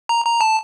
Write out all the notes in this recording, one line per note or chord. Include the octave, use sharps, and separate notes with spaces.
A#5
A#5
A5